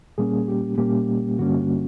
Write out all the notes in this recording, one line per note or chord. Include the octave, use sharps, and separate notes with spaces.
A#2 G3 A#3 C#4 G#4
G4
A#2 G3 A#3 C#4 G4
G2 D3 G3 A#3 C#4 F#4